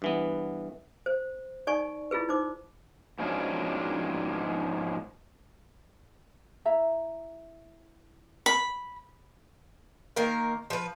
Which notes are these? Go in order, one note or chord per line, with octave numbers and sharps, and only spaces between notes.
G2 E3 B3
C5
D#4 D5 G#5 C#6
E4 F4 G#4 B4
D#4 C5 D6
G#2 B2 F3 G#3 C#4 D4
E4 E5 A#5
B5
D#3 A#3 A#4
F3 B4